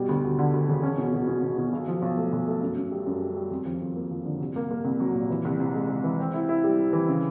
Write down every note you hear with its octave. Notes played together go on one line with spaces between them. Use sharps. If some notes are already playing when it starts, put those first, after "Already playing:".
Already playing: B2 G3
D2
D2
D3
D2
E1
C#4
B2
B2
B2
B2
B2
B1
F3
B1
A3
B1
A3
F#2
F#2
G3
F#2
G3
G3
F2
F3
F2
A#3
F3
D3
C2
A#3
A#3
C2
F#3
A#2
E3
C2
C3
G#3
C3
E3
C4
E4
E4
G3
C4
E3
C#3